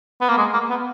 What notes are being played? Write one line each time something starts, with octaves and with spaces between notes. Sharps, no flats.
B3
A#3
G#3
A#3
B3